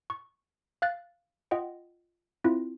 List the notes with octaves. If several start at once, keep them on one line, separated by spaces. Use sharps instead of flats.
C#6
F5 F#6 A6
F4 D#5 F#5 G5
C4 E4 F4